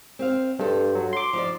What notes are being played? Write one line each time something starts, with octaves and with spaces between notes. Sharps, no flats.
C4 C5 F5
G2 A4 C5
F#3
C6 D6
F3 D#4 D5